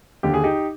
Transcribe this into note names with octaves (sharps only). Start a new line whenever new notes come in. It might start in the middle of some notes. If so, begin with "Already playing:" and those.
D#2 D3 G4
G#4
D#4 G4